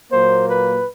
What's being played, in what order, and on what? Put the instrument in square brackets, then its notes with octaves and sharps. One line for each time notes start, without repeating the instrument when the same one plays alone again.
[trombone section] A#2 F#3 A#3 C5
B4